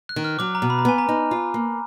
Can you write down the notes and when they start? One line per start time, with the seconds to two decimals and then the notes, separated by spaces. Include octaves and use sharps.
0.09 F#6
0.16 D#3
0.24 F6
0.39 F#3 D6
0.55 A#5
0.62 B2
0.70 B5
0.79 A#5
0.85 B3 G#5
0.98 A#5
1.09 D#4
1.31 F4
1.54 A#3